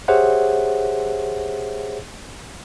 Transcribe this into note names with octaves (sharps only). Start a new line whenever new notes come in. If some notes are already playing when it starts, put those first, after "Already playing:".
G4 G#4 C5 C#5 E5 F#5